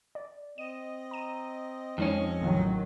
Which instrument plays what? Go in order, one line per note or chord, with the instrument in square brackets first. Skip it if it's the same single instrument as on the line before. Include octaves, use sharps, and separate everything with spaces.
[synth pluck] D5
[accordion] C4 D#5 [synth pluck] D#7
[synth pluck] A#5 D#7
[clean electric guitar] F2 F3 C#4 [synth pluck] G#3 D#4 C#5
[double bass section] A1 D#3 F#3